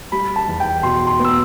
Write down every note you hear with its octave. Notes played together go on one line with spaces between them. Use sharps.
G3 B5
A5
E2
G5
B2 C6
C6
B3
E6